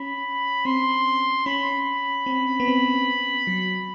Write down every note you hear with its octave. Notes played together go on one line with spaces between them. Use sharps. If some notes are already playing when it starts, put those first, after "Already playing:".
Already playing: C#4 B5
C4 C6
C#4 B5
C4
B3
C4
F#3